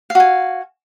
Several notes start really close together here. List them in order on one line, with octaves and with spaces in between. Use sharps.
F5 F#4 G#5